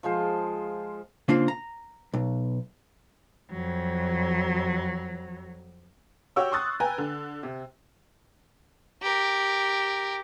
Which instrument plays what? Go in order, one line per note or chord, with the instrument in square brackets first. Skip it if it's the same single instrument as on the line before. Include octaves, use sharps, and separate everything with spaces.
[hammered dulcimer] F3 G#3 F4 C5
[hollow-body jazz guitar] C#3 A#3 C4 D4 F4
A#5
B1
[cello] F2 F#3
[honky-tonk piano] F#4 G4 C#5 F#5 G5 E6
C6 C#6 D#6 F#6 A6
B4 G5 G#5 A#5
D3
C3
[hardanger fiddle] G4 A#4